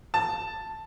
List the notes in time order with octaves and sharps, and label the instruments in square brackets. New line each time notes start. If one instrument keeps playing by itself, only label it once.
[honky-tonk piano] A5